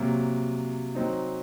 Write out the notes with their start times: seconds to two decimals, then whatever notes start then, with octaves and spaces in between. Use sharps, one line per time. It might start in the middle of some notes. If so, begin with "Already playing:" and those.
Already playing: C3 F#3 A#3
0.95 F#3 C4 D#4